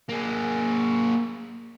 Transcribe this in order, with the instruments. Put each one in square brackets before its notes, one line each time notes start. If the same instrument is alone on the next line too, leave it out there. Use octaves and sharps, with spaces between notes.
[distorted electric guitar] A#3 G#4